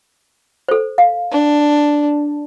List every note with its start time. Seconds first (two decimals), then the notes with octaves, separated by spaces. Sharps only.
0.69 A4 C5
0.98 F5
1.31 D4